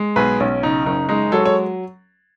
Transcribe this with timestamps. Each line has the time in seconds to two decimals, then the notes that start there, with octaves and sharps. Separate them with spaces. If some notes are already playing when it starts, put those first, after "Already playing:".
Already playing: G#3
0.16 B1 G#4 B4
0.40 B1 C#4
0.63 C#3 D#4
0.86 F#1 D#4
1.09 G#3 D#4
1.32 F#3 A4 C#5
1.45 C#5